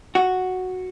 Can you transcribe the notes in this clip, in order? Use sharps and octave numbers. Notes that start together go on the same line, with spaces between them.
F#4